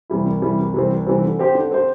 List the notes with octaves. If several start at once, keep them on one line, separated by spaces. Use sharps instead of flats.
C3 E3 G3 E4
C2
C3 E3 G3 E4
C2
C3 E3 G3 C4
C2
C3 E3 G3 C4
D3
C4 G4 C5
D3
C4 G4 C5